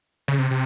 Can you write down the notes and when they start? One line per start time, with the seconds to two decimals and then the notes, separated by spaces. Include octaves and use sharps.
0.28 C#3
0.39 C3
0.51 C3